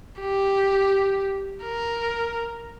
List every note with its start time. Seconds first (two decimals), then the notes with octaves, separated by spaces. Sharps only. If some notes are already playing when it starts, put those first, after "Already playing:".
0.20 G4
1.64 A#4